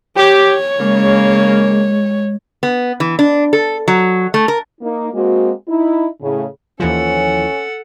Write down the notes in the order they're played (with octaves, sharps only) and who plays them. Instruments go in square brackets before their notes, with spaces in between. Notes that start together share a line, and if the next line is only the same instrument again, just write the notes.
[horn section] G4 [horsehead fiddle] C#5
[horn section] C#3 A#3 [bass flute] G#3
[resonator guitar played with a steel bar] B3
E3
D4
A4
F#3
A3
A#4
[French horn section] A#3 D#4
G#3 A#3 C4 F#4
D#4 E4
A2 C#3
[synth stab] D#2 E3 F3 [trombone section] C#4 [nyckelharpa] A4 F#5